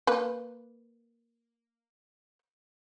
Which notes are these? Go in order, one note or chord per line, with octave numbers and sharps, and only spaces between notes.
A#3 B4